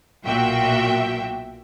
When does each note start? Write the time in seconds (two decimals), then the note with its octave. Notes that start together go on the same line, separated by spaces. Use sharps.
0.25 B1 A#2 F#4 E5 G5